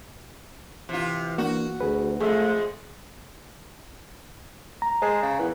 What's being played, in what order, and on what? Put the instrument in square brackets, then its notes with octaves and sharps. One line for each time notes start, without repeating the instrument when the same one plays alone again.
[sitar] C3 F4 [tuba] E3
[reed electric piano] A#3 D4 [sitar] F#4
[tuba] D2 [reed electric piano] G#4 B4
[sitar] F2 G#3 [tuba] A3 [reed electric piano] G#4 E5
[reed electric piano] A#5
[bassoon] G#3 [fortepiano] G#4 C5 A5
[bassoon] C#3
[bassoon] E2 [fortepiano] E3